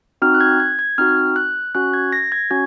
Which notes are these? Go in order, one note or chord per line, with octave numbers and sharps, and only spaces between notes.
C4 D#4 F#4 F6
F#6
G#6
G#6
G#6
C4 D#4 F#4 F6
F#6
C#4 F#4 F#6
G#6
A#6
G#6
C#4 F#4 G#6